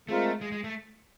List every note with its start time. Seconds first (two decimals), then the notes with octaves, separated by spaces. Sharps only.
0.09 G#3 A3 C4 F4 A#4
0.41 G#3
0.52 G#3
0.64 A3